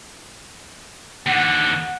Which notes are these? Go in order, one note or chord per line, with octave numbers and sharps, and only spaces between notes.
D#2 D3 F#5